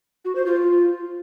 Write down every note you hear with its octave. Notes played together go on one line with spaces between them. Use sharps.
F#4
C5
F4